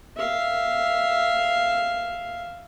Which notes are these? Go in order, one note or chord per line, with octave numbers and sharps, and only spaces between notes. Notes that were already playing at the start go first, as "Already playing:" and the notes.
E5 F5